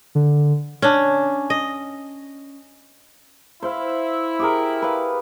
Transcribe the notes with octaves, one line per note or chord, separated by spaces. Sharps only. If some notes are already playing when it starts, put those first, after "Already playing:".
D3
C#4 D4
D#5
E4 C5 F5
G4 G#4 A#4
B4 F5